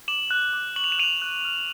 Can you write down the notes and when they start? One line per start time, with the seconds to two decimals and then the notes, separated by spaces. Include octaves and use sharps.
0.08 D6 E7 F#7
0.31 F#6
0.53 D6
0.76 C#6 F#7
0.84 F7
0.92 E7
0.99 F#6 D#7 F7
1.22 F#6
1.45 F6